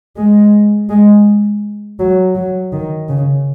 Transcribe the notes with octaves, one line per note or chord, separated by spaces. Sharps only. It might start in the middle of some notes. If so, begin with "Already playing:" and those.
G#3
G#3
F#3
F#3
D#3
C#3